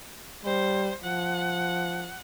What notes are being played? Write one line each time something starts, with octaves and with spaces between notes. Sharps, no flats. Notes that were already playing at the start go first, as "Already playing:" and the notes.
G3 C5
F3 F#5